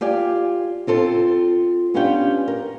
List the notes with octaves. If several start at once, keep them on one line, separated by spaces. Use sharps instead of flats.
F4 G4 D5 G#5
C4 F4 A4 C5
B3 C#4 D4 F4 G4 G5
A#4